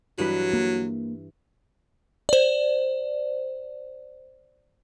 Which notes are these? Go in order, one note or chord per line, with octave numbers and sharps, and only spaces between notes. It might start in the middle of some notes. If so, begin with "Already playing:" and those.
G2 E3 F#3 B4
A#3
C5 D5